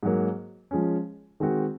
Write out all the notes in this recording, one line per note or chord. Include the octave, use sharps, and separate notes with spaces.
G#2 F#3 A#3
F3 G#3 C#4
D#3 G#3 C4 F#4